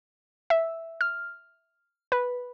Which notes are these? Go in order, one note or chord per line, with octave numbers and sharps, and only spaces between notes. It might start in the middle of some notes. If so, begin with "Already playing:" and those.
E5
F6
B4